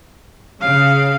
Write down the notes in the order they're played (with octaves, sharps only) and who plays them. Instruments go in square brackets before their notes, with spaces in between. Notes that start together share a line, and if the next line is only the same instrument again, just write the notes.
[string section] C#3 [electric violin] F5